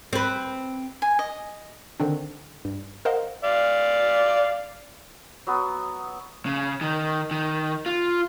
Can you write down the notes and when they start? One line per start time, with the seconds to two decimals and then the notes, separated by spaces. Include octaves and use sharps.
0.13 C4 B4
1.02 G#5
1.19 D#5
2.00 D3 D#3 C4 D4
2.65 G2
3.05 A#4 C5 D#5 F5 F#5
3.44 D5 F5
5.47 F#3 B3 D#6
6.46 C#3
6.81 D#3
7.31 D#3
7.86 F4